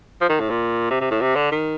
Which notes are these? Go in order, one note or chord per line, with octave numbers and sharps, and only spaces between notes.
F3
D#3
A2
A#2
C3
C3
A2
C3
D3
D#3